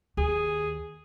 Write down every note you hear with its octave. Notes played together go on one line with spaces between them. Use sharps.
D#2 G#4